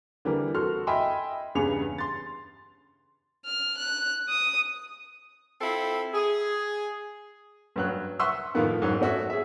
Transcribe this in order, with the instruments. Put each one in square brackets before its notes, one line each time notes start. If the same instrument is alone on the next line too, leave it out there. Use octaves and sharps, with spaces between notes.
[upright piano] D3 E3 G3 A#4
F#4 A4 C6 F6
D#5 E5 G5 G#5 B5 C6
E2 G2 C#3 G#4 C#7 F7
C6 A6
[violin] F6
F#6
D#6
[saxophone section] C4 E4 F4 A4
G#4
[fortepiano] G2 F#3 F#6
E5 F#5 C6 C#6 D#6 E6
A2 D#3 F3 A#3 B3
G#2 F#3
A3 B3 C#4 F#4 E5
G#4 E5